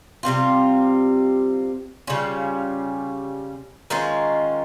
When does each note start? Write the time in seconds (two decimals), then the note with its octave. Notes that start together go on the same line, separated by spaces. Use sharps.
0.23 C3 G3 C4 F4
2.07 C#3 G3 C#4 F4
3.90 D#3 G#3 C#4 F4